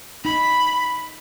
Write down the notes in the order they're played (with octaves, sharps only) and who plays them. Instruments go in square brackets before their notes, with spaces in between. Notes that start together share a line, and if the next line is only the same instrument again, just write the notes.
[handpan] D#4 [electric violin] B5